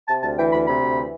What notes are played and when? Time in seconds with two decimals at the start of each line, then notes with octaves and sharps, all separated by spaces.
0.08 C3 A5
0.22 D2 A5
0.37 E3 G5
0.52 D2 B5
0.67 C3 B5
0.82 D2
0.96 E3